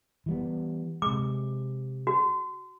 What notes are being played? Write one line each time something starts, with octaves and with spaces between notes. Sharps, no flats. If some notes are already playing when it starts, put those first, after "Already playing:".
E3 G3 B3
C3 G#3 D6
F#4